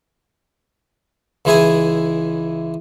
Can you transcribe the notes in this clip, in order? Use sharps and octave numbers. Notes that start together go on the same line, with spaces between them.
C#2 E3 G#3 E4 G#4 G#5